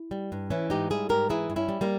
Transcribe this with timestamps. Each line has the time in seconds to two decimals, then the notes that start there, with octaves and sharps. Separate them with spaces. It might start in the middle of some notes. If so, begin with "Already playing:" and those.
Already playing: E4
0.11 G3
0.32 G2
0.50 E3 C#4 E4
0.70 G#2 D#4 G4
0.90 G3 E4 G#4
1.09 G#2 G4 A#4
1.29 E3 E4 G#4
1.50 G2
1.56 C#4 E4
1.69 G3
1.81 G3 A#3